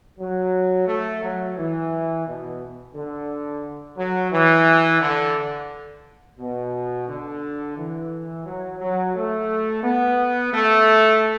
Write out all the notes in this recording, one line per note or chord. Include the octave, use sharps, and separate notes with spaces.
F#3
A3
F#3
E3
B2
D3
F#3
E3
D3
B2
D3
E3
F#3
F#3
A3
B3
A3